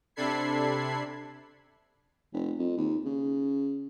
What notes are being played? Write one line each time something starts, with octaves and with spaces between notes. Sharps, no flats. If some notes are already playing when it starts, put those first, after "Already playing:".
C3 D4 A4 B5 G#6 C7
F1
F2
D#2
C#3